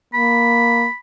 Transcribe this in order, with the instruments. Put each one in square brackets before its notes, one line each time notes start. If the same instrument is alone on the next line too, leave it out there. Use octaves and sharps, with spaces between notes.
[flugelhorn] A#3 [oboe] B5